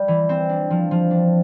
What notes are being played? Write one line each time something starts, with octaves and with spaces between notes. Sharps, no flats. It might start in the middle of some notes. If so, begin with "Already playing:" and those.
Already playing: G3
E3
C4
D4
F3
F3
D4